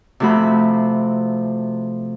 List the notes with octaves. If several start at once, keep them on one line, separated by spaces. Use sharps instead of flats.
C3 F3 A3 F#4 B5